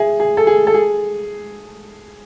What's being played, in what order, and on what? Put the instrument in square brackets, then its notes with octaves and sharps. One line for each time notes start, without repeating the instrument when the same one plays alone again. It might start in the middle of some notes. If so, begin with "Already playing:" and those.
Already playing: [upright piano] G#4 [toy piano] E5
[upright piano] G#4
A4
G#4
A4
G#4